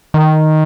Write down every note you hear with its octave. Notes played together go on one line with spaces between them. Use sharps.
D#3